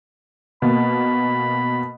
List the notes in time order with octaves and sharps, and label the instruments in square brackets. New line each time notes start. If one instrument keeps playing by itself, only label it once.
[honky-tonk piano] B2 A#3 [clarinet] B5